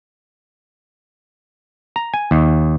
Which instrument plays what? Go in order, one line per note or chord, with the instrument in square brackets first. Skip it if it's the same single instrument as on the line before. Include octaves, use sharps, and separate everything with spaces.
[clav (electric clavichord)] A#5
G#5
D#2